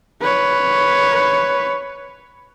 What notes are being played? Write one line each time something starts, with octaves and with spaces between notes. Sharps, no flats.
B4 C#5